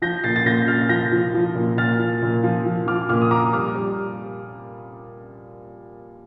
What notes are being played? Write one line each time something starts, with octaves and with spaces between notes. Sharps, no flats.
F3 G6 A#6
A#2 A6 C7
A6
A#2 G6 A#6
A#2 F6 A6
F3 G6 A#6
F3
F3
A#2
A#2 F6 A6
F3
A#2
F3
F3
F3 D6 F6
A#2 D6 F6
D#6
F3 A#5 D6
G3 D6 F6
G3